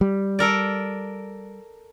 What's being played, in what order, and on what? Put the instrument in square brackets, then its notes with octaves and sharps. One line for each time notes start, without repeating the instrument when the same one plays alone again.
[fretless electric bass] G3
[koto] A4 A#4 D5